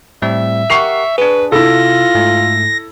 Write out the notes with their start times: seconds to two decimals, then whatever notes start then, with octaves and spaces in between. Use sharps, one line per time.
0.22 A2 G3 C4 E5
0.70 G4 A#4 F#5 C#6 C7 F7
1.18 D4 G#4 B4
1.52 C3 E4 F4 A4 A#6
2.15 G#2 A3